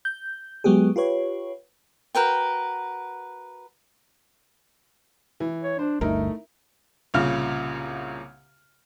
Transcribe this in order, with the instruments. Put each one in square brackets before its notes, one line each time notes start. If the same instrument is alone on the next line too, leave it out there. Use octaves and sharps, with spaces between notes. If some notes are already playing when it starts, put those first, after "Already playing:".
[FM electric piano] G6
F#3 G#3 B3 G4 G#4
F4 G4 B4 C#5
[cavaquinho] F#4 A#4 B4 G5
[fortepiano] E3
[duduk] C#5
[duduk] D4 [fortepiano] C5
[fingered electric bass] G1 D2 G2 [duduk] A3 [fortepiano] D#4 E4 A#4
[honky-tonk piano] C2 A#2 C#3 F6